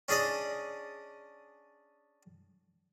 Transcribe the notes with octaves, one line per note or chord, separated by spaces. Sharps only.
C#4 D4 G#4 D5 D#5